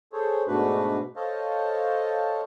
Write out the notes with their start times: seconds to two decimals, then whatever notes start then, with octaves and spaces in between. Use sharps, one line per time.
0.13 G#4 A4 C5 C#5
0.47 G#2 B2 A3 D4 F#4 B4
1.16 A4 C5 C#5 D#5 F5 A5